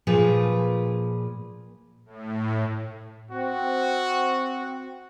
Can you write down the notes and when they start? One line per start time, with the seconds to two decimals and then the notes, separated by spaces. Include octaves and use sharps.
0.07 A#2 F3 G#4 B4
2.05 A2
3.31 C4 F#4